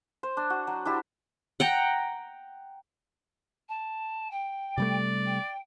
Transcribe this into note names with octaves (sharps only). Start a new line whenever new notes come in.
C5
D4
F#4
F#3
D4 E4 G4
F#5 G5 A#5
A5
G5
C3 G3 A3 D5
G5